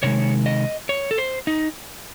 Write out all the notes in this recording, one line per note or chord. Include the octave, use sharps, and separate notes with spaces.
C3 D#3 G#3 C#5
D#5
C#5
A4
C5
D#4